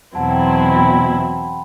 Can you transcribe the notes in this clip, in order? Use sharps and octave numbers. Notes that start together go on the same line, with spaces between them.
E2 B2 F#3 C4 E4 F#5 A5
G5 B5
B5
A5 C6
G5 B5
G5 B5